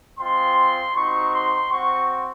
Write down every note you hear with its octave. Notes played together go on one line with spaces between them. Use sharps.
G#3 C4 F4 C6
C4 D#4 F#4 C#6
C6
C4 F#4 C#6